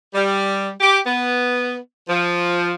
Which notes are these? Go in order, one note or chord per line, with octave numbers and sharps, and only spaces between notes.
G3
G4
B3
F3